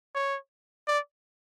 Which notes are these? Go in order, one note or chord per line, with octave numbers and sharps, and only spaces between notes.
C#5
D5